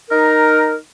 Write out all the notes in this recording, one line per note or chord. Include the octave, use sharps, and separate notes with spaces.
D#4 A#4